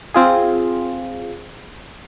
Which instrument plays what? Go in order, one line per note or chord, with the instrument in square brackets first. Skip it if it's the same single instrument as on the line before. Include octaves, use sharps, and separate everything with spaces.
[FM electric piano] C4 F4 G#4